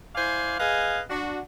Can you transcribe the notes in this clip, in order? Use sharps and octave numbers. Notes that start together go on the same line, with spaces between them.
E4 C5 D5 F5 G#5
G#4 B4 D#5 F5 G#5
D4 F#4